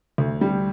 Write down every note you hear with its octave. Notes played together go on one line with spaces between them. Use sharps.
D2
G3